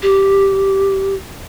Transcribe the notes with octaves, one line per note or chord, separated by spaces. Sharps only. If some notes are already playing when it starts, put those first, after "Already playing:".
G4